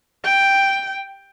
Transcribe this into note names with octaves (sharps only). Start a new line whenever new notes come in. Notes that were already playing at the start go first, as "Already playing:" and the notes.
G5